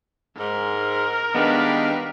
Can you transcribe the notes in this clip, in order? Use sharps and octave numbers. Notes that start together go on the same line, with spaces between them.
G#2 A#4
D#3 G3 G#3 B3 D4 B4 F5